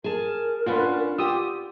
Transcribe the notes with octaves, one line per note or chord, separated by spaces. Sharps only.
G#4 A#4 A5
C#4 D4 F4 B4 F#5
F4 G4 D#6 E6